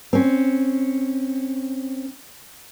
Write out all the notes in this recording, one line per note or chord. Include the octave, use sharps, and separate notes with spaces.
C4 C#4